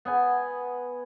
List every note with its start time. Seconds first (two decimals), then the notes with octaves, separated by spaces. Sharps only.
0.05 B3 F#5 G#5